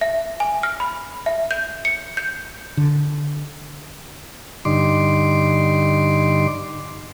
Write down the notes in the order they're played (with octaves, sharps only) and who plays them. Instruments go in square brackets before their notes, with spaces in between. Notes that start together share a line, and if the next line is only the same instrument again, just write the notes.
[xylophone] E5
G#5
F6
B5
E5
G6
C#7
G6
[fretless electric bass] D3
[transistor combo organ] G2 D3 D#4 C6 D6